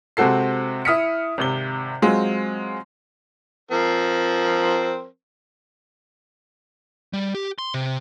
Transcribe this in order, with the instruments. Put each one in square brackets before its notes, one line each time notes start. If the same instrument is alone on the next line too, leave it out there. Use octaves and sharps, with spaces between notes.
[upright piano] C3 G#3 C4 F#4 A4 C7
E4 D#6 F6 B6 C#7
G#1 C3 G7
F#3 G#3 C4 F4
[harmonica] F3 C4 A#4
[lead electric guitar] G3
G4
C6
C3